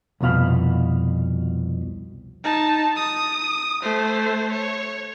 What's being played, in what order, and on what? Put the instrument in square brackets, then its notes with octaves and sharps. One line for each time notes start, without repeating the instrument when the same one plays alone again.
[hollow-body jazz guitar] C2 F2 B2 F5 B5
[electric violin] D#4 A5
D#6
A3 C5
C#5